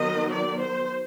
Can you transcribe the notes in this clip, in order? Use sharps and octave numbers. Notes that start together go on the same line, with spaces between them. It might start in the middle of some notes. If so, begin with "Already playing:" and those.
Already playing: D#3 F#3 B3 D#5
D5
C5